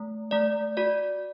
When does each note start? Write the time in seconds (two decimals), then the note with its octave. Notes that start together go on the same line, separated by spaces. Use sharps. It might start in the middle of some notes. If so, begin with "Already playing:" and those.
Already playing: A3
0.31 A3 D5
0.77 F#4 D5